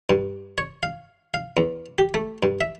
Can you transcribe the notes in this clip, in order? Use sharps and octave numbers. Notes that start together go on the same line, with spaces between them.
G2
C#5
F5
F5
E2
G4
A3
G2
E5